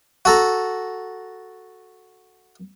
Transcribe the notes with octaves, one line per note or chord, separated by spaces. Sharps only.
F#4 A4 A#5